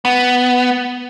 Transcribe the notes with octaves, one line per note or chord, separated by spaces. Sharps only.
B3